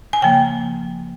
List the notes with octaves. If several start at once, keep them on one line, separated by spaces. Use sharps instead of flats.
G#5
C#3 F3 A#3 G5